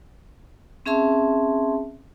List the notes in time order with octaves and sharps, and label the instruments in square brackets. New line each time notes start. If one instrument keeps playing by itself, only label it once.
[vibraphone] C4 C#4 G#4 E5 A5 C6